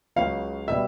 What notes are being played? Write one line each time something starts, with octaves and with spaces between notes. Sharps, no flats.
C#2 C#3 F#3 F5
B2 G3 E5